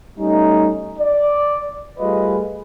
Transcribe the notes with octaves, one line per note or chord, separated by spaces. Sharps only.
G3 A3 C#4 D#4
D5
G3 A3 F4 G#4 B4 D#5